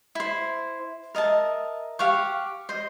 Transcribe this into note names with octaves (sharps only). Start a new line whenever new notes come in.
E4 C5
A#4 D#5 E5 A5
G4 F5 F#5 C#6
C5 D#5